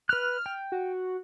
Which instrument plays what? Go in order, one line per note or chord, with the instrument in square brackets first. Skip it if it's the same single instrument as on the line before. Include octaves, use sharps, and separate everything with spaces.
[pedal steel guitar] B4 F#6 [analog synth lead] F6
[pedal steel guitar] G5
[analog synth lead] F#4